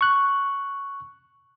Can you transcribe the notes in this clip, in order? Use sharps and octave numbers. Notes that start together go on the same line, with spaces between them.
C#6 F#6